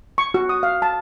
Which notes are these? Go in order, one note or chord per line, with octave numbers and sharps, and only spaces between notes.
C#6
F#4
D#6
F5
A5